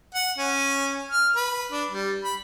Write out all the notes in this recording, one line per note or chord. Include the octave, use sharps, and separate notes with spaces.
F#5
C#4
F6
B4
D4
G3
B5